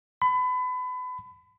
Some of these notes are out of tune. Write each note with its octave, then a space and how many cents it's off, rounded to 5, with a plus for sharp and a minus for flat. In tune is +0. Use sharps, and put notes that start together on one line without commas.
B5 +30